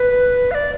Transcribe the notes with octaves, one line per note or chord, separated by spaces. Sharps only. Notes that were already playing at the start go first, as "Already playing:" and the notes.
Already playing: B4
F5
D5